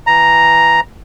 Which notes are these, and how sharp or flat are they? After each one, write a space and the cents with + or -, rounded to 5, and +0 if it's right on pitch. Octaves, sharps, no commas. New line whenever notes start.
E3 +0 A#5 +0